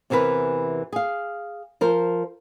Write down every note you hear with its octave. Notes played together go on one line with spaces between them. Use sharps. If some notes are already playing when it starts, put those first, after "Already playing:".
E2 C3 E3 A#4 B4
G#4 F5
F3 A#4 C5